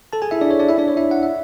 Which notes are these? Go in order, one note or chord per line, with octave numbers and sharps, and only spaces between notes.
A4 A5
G#4 G#5
E4 E5
D4 D5
C#5
D4 D5
E4 E5
D4 D5
C#5
E4 E5
F#5
E5